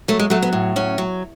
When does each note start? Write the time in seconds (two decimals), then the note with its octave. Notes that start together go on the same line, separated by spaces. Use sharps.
0.08 F#3 A3
0.19 G#3
0.30 F#3 A3
0.42 B3
0.53 A2
0.76 F#3 C#4
0.98 F#3